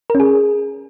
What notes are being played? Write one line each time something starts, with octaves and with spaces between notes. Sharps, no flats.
A#4
C#4
G#4